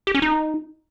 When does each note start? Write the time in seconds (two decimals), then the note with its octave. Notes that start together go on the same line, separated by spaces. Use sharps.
0.07 G4
0.15 C#4
0.22 D#4